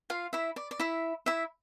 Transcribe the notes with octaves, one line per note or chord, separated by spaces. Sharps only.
F4 F5
E4 E5
D5
D5
E4 E5
E4 E5